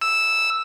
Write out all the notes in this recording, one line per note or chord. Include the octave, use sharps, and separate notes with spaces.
E6